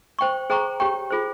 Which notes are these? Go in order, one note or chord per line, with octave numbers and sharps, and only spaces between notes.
C5 G5 C#6
G#4 C5 G5 A#5 C#6
G4 C#5 G5 C#6
F4 G#4 C5